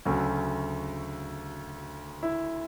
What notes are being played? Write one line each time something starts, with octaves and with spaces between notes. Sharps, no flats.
D2 C#3 F#3 A3 C#4 F#4
E4